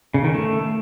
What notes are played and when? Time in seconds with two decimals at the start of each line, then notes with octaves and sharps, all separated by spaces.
0.14 C#3
0.24 D#3
0.34 A3